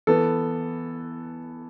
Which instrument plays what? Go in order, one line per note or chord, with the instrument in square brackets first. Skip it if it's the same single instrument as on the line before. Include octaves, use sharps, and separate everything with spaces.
[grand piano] E3 B3 A4